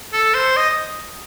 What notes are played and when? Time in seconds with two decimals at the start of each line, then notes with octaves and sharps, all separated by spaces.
0.13 A4
0.34 C5
0.57 D#5